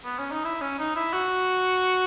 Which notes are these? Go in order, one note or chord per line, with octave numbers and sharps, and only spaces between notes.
B3
C#4
D#4
E4
C#4
D#4
E4
F#4